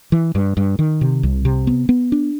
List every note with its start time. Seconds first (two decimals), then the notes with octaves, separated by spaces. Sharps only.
0.12 E3
0.35 G2
0.57 G2
0.79 D#3
1.01 C3
1.23 C2
1.45 C3
1.67 B3
1.89 B3
2.12 D4